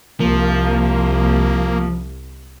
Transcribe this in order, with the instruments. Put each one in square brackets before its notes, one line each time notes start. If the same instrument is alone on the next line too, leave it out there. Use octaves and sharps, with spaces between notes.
[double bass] C2 [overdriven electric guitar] F3 [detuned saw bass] A#3